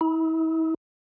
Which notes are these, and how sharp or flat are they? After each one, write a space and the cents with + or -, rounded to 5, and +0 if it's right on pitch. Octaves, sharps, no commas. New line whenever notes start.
E4 -40